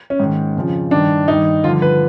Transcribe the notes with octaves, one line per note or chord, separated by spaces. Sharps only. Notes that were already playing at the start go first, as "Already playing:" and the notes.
C#4
G#2 D#3
F2 C#3 F3
G2 D#3 D4
G2 D#3 D#4
G2 D3 F3 F4
B4